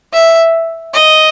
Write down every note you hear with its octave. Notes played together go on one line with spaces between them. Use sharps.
E5
D#5